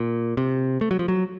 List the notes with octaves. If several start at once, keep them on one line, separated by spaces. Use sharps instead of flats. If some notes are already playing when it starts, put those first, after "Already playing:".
Already playing: A#2
C3
A3
F#3
F3
F#3